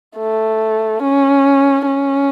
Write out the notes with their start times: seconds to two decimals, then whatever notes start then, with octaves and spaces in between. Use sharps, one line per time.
0.17 A3
1.02 C#4
1.86 C#4